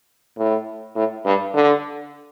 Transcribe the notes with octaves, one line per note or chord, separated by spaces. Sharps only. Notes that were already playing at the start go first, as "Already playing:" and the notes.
A2
A2
G2
D3